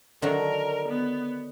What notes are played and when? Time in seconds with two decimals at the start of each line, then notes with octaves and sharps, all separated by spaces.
0.22 D3 D#3 F#3 A#4
0.89 B3